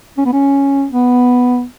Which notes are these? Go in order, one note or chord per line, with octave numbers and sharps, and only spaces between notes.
C#4
B3
C#4
B3